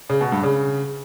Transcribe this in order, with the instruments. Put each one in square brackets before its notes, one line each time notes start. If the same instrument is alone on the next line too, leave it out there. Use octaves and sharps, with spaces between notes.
[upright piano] C#3
B2
G2
C#3